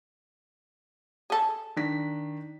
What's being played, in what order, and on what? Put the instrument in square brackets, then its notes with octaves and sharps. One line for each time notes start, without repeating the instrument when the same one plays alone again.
[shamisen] G#4 A4
[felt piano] D#3 D4 B6